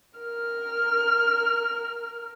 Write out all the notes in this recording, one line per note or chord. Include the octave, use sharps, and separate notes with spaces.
A#4 F6